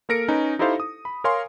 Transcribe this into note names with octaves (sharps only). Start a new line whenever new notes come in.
A#3 A4 A#4 A#6 C#7 D7
C#4 D#4 B4
D#4 E4 G4 A4 C5 F5
D#6
B5
A#4 C#5 F5 G#5 C6